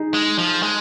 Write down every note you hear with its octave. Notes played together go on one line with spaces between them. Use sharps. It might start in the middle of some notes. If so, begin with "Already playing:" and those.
Already playing: D#4 G#4
G#3
F3
G#3